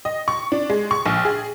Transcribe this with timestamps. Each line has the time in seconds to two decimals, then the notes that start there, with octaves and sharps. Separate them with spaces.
0.05 D#5
0.28 C#6
0.52 D4
0.70 G#3
0.91 C#6
1.06 A#1
1.25 G#4